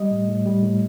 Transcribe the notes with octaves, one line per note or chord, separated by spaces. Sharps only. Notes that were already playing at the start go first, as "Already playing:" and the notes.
Already playing: G3 D#5
A2
A2
G3
A2